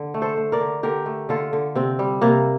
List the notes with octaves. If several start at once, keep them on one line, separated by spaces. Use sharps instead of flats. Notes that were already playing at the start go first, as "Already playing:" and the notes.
Already playing: D3
A3
A4 C5
A3
A#4 D5
D3
D3 G4 A#4
A3
D3 F4 A4
D3
C3 C4
G3
C3 A#3